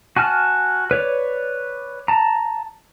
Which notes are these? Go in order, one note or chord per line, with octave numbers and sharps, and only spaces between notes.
F#4 G#5 A5 F6
B4 C#5 D5
A5 A#5